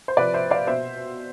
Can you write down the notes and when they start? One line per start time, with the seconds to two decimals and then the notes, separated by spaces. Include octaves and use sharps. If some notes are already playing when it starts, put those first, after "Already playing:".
0.08 C5
0.17 C3 F3 B4 D5
0.34 C5 E5
0.51 D5 F5
0.67 B2 C5 E5